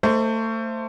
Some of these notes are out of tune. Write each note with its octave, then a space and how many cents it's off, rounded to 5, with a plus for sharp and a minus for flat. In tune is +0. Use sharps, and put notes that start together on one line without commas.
A3 +30 C5 +0 D#5 +35